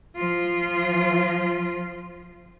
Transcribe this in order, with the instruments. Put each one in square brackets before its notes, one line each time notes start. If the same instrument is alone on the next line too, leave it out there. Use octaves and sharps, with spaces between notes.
[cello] F3 F4